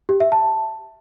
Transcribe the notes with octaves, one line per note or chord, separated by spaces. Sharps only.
G4
E5
A5